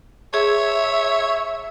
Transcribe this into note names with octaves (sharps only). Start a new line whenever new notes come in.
G#4 C#5 E5